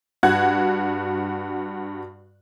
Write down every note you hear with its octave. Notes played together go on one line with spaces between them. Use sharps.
G2 F#4 F#5 F#6 G#6